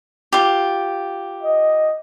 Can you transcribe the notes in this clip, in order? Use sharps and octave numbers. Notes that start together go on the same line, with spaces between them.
F4 G4
D#5